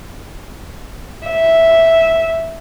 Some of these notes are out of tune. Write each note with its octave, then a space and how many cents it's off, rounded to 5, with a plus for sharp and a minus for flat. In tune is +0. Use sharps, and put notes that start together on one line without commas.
E5 -5